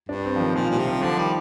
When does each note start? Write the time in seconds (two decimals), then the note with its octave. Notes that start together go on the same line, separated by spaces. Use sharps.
0.09 G2 D4
0.25 C4
0.36 F3
0.40 D#3
0.55 A#2 F3
0.70 A#2 G3
0.79 C3
0.87 F3
1.02 D3 F3
1.18 D#3 G3